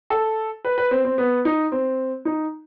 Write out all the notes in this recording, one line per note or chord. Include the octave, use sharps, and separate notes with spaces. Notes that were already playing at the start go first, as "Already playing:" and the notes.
A4
B4
B4
C4
C4
B3
D#4
C4
D#4